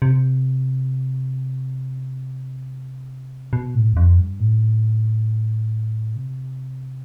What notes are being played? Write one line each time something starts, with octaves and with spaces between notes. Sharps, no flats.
C3
B2
A2
E2
F2
G2
A2
C3